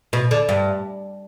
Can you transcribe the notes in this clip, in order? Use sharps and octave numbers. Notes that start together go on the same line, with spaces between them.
B2
D3
G2